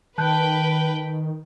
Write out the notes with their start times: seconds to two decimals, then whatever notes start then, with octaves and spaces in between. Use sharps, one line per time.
0.18 D#3 B4 G5 A5 F#6 G6